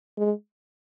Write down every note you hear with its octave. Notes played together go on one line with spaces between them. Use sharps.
G#3